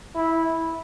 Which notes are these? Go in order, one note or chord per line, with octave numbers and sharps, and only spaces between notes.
E4